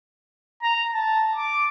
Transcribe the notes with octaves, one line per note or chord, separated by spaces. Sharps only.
A#5
A5
D6